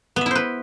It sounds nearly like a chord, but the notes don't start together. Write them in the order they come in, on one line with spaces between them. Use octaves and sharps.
B3 E5 E4 C5 B4